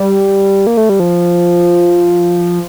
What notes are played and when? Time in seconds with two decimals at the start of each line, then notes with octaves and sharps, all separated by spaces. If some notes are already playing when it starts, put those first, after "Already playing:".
Already playing: G3
0.67 A#3
0.77 A3
0.89 G3
1.00 F3